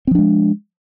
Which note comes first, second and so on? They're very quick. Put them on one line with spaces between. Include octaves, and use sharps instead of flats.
C4 F3 D4 G#3